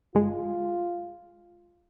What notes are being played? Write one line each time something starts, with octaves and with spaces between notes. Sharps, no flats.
G1 G#3 F4